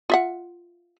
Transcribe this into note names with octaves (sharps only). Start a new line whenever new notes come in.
F4 E5 F#5